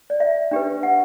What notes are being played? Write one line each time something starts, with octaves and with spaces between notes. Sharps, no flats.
D5
E5
D4 G4 B4
F#5